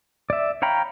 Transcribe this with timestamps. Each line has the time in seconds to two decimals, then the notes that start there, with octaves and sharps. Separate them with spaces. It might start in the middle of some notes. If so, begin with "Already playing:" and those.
0.30 D5 E5
0.62 C#5 F5 G5 A#5 B5